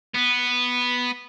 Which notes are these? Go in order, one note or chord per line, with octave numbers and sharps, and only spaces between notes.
B3